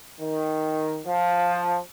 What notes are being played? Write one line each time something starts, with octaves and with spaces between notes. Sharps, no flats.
D#3
F3